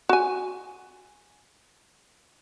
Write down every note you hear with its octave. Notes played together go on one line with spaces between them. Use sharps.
F#4 G#5